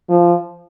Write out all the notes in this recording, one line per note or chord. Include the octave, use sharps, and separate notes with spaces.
F3